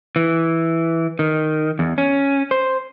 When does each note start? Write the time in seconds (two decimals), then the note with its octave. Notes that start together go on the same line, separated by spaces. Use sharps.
0.16 E3
1.19 D#3
1.79 E2
1.98 C#4
2.51 C5